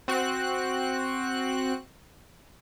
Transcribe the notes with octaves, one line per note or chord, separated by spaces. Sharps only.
C4 F#4 F#6